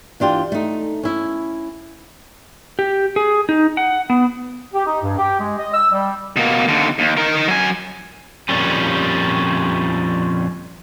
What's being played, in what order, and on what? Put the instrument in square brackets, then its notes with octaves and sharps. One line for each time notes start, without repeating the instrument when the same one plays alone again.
[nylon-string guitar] E3 D4 F4 G4
A3 D#4
C#4 E4
[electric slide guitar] G4
G#4
D#4
F#5
B3
[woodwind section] G4
D#4
G2
G4
G#3
D#5
E6
G3
[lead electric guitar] B2 A#3
D#2 D3
D#2
D#4 A#4
F#3 G#5
[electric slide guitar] F2 A#2 G3 C#4